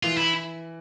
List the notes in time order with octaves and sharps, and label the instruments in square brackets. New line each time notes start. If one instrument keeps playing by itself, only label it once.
[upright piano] E3 [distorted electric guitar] F4
[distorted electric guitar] E4